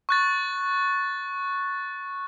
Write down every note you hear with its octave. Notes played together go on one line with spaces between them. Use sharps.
C#6 F#6 A6